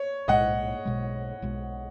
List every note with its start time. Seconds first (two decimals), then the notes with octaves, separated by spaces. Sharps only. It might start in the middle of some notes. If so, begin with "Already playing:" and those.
Already playing: C#5
0.28 B1 A2 G#3 D#5 F#5
0.85 B1 B2 G#3
1.42 B1 B2 G#3